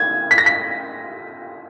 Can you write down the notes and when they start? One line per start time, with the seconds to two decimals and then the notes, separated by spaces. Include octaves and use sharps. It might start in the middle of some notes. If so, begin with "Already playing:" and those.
Already playing: G#6
0.31 B6
0.38 A#6
0.46 B6